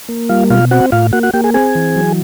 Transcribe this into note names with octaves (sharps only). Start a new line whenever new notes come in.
A#3
G3 F4 F5
B2 F4 F5
C4 F#4 F#5
A2 F4 F5
A#3 F#4 F#5
F#4 F#5
A#3 G4 G5
G#4 G#5
C4 G#4 G#5
E3
F#3